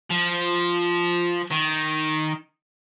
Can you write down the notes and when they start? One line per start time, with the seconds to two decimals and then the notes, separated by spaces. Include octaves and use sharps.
0.11 F3
1.51 D#3